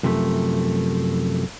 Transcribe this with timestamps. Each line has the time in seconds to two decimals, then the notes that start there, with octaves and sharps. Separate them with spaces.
0.03 F#2 C3 F3 A3